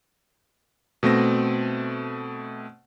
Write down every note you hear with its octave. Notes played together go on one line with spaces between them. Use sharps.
B2 A3 C4 A#6